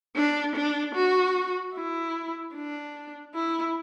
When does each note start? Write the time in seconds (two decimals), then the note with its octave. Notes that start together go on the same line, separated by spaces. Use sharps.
0.16 D4
0.55 D4
0.95 F#4
1.75 E4
2.55 D4
3.35 E4